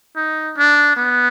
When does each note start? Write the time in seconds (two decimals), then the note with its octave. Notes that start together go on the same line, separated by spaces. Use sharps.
0.16 D#4
0.57 D4
0.97 B3